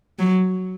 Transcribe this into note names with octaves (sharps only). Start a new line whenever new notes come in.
F#3